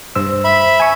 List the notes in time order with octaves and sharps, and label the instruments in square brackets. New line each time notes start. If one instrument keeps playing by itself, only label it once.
[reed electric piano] G2 C5 E6
[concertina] E5 B5
[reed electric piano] G#5 C#6